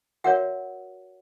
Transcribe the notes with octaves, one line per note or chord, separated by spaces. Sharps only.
F#4 A#4 C#5 E5 F#5